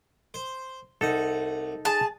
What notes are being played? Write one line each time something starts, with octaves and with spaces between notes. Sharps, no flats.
C5
C2 D#4 A4 F#5
G#4 A5